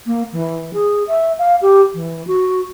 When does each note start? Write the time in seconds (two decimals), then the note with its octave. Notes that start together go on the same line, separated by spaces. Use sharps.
0.06 A#3
0.32 E3
0.73 G#4
1.08 E5
1.39 F5
1.61 G4
1.94 E3
2.27 F#4